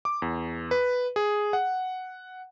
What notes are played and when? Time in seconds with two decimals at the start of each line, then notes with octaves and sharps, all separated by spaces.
0.05 D6
0.22 E2
0.71 B4
1.16 G#4
1.53 F#5